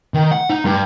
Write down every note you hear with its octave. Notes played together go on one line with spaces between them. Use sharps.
D#3
F#5
D#4
G2